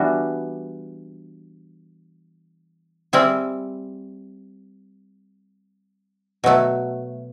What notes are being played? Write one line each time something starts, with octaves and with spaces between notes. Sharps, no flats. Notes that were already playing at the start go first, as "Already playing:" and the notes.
Already playing: E3 G3 B3 D4 F#4
G3 C4 E4 G#4
B2 F#3 A3